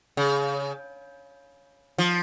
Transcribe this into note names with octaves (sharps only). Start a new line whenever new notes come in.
C#3
F3